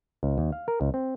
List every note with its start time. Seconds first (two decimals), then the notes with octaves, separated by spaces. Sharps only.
0.23 C#2
0.38 D#2
0.52 F5
0.68 A#4
0.81 C#2
0.94 C4